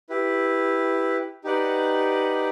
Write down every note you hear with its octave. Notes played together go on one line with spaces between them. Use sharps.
E4 G4 B4
D#4 G4 B4 D5 F#5